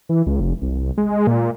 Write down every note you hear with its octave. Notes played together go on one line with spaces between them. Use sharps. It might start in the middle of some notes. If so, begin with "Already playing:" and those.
E3
C#2
F1
C2
G#3
A#2